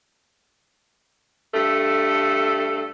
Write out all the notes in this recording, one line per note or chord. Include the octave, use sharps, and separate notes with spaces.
G2 A3 A4